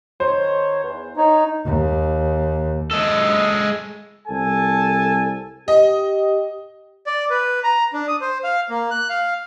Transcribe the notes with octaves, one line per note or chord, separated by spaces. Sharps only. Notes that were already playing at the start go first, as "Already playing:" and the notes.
D#3 C5 C#5
E2
D#4 C#5
D#2
G#3 A4
C2 A4 G#5 A5
G4 D#5
D5
B4
A#5
D4
D#6
C5
F5
A#3
F#6
F5